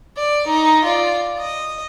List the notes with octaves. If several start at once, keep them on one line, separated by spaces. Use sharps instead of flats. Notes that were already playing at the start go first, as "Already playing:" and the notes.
D5
D#4
F4 D5
D#5